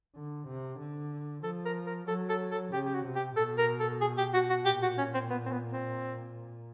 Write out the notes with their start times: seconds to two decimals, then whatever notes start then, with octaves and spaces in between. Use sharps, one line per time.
0.15 D3
0.47 C3
0.79 D3
1.44 F3 A4
1.65 A#4
1.86 A#4
2.08 F#3 A4
2.29 A4
2.51 A4
2.72 C#3 G4
2.85 G4
2.94 F#4
3.04 C3
3.15 G4
3.36 B2 A4
3.58 A#4
3.80 A4
4.01 G#4
4.18 G4
4.34 F#4
4.50 F#4
4.65 A#2 G4
4.82 F#4
4.98 C#4
5.14 C4
5.30 B3
5.45 C4
5.52 B3
5.72 C4